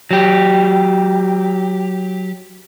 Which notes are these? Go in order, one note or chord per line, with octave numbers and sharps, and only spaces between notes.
F#3 G4